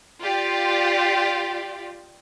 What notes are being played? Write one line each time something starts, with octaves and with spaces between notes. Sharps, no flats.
F4 G4 D5